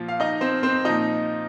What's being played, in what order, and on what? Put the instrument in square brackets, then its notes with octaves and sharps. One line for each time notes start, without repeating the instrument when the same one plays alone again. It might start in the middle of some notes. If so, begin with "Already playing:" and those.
Already playing: [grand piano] A#2 F3 F4
F5
D#4 D#5
C4 C5
C4 C5
A#2 F3 D#4 D#5